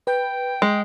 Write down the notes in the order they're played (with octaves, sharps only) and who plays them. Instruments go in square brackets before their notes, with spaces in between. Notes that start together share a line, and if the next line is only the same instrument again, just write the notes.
[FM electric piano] B4 [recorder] G5
[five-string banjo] G#3